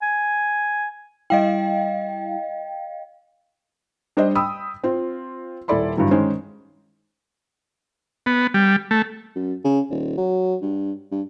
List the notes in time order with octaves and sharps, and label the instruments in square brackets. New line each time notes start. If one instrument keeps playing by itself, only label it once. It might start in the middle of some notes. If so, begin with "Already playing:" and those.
[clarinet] G#5
[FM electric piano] G3 E4 [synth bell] D#5 F5 G5
[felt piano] G3 D4 C5 D5 D#5
G5 B5 D#6 E6
C4 F4
D#1 E4 A4 D5 B5 C6
G2 D3 E3 F#3
D#3 G#3 C#4 C5
[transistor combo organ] B3
G3
A3
[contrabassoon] F#2
C#3
D#1
F#3
G2
G2